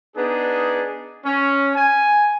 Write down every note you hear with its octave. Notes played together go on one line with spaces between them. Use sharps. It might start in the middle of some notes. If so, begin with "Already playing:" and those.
B3 D4 D#4 G#4
C#4
G#5